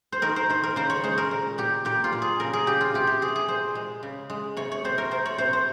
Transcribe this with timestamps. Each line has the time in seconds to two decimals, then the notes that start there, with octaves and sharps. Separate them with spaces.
0.12 C5
0.22 D#3 A#4
0.36 C5
0.49 D#3 C5
0.63 A#4
0.76 C#3 C5
0.90 C#5
1.04 G#3 C5
1.18 A#4
1.31 A#2
1.58 A#2 G4
1.85 A#2 G4
2.04 F4
2.13 A#2
2.22 G#4
2.40 C#3 A#4
2.53 G#4
2.66 C#3 G4
2.81 F4
2.94 C3 G4
3.07 G4
3.22 C3 G#4
3.36 G#4
3.48 A#2 C5
3.75 G#3
4.03 C#3
4.30 G#3
4.57 C3 C#5
4.72 C#5
4.85 C3 C5
4.98 A#4
5.11 C3 C5
5.26 C#5
5.38 C3 C5
5.53 C5